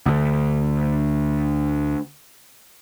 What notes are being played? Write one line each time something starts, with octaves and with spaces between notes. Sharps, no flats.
D2 D3